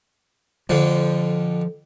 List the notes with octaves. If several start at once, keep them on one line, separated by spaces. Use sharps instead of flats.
F2 D3 F3